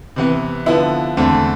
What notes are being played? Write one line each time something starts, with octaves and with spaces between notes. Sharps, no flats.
C3 E3 B3
D3 F3 B3 E4
E2 D3 A3 C4